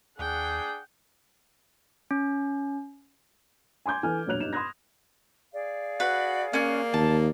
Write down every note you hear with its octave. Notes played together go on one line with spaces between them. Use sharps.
D#2 D4 G#4 F#5 G5
C#4
G#5 C6 D6 G6 G#6
E3 A4 G#5 F6
E1 A#1 F#3 C#5 F#6 F7
G2 D#4 E7
B5 C6 D#6 F#6 G#6 A#6
G#4 D5 F5
F#4 B4
A#3 C#4 F#6
D#2 A5